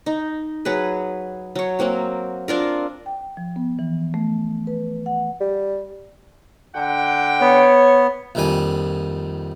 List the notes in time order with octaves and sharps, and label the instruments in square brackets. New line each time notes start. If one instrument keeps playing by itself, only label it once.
[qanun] D#4
F#3 G#4 B4
F#3 C#5
F#3 A#3 C4 F#4
C4 D4 F4 A#4
[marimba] G5
F3
B3
E3
A3
B4
F#5
[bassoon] G3
[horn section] D3 F#5 G5
[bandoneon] B3 [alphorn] C#5
[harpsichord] A#1 F2 D#3 G3 G#5